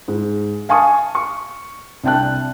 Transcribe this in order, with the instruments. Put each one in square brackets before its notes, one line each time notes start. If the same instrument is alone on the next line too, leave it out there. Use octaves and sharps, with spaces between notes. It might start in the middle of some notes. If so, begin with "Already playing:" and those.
[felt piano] G#2
F5 G#5 A5 C#6 D#6
C#6
C2 D4 G5 A5 F#6